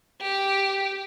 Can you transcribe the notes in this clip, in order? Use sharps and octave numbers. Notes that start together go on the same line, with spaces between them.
G4